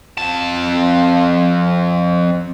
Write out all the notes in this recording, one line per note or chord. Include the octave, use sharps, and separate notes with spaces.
F2 A5